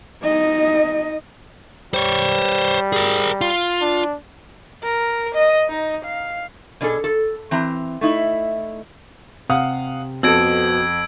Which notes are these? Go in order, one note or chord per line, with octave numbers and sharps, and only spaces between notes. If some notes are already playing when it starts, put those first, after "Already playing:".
D#4 D#5
G3 C5 C#5
G#4 A#4
F4
D4
A#4
D#5
D#4
F5
B2 D4 G#4 A4
A4
E3 C4 A#5
A3 D#4 E4
C3 F5 F#5 D#6
F2 B2 C4 A4 E6 G#6 D7